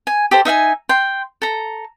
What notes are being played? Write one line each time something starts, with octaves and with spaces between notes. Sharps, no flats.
G#5
G4 A4 C5
D#4 E5 F5 G#5
G5 C6
A4 A#5